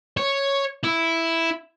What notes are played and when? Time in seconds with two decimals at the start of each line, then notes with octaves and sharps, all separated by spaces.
0.17 C#5
0.84 E4